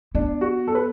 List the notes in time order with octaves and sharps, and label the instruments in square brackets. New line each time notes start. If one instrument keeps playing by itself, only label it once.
[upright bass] B3 [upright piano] D4
[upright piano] F#4
A4
B4